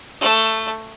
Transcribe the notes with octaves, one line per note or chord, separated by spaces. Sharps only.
A3